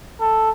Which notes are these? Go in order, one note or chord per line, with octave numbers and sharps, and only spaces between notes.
A4